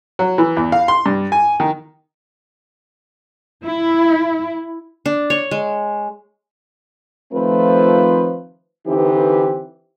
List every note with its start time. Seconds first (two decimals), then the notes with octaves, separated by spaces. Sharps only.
0.19 F#3
0.38 E3
0.57 E2
0.72 F5
0.88 C6
1.06 G2
1.32 G#5
1.60 D#3
3.65 E4
5.06 D4
5.30 C#5
5.51 G#3
7.33 D#3 F3 A3 C4 F4 B4
8.87 D3 E3 C4 D#4 G4 B4